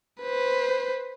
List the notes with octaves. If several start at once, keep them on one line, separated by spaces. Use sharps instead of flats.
B4 C5